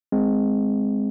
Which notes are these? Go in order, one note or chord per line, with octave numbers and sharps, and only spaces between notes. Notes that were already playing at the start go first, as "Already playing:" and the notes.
G#3 C4